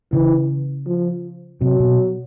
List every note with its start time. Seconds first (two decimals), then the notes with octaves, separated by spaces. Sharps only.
0.13 C#3 E3
0.87 F3
1.61 C3 F#3
1.80 B2